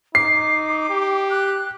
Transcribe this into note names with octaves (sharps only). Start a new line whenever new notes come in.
D#4 D6 C7
G4
F#6